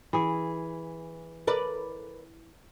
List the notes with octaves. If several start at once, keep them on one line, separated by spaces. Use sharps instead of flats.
E3 G#4
A#4 B4 D5